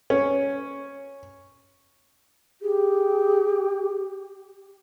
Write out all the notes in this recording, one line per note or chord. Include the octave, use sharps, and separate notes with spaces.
C#4
G4 G#4